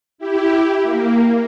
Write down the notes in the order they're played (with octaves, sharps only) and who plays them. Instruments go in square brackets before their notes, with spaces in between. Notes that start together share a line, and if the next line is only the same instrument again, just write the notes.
[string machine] E4 G4
A#3